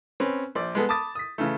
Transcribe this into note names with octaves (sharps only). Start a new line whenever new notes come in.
C4 C#4 B4
A#1 C5 D5
G#3 B3 A4
A5 B5 D6 D#6 A6
D#6 B6
C#3 E3 A3